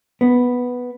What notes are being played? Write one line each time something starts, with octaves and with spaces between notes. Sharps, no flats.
B3